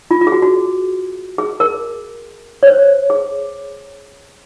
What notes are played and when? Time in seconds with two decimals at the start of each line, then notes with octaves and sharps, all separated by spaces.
0.11 F4
0.21 F4
0.27 G#4
0.32 F#4
0.42 F#4
1.38 G#4
1.60 A#4
2.63 C#5
2.67 C5
3.10 G#4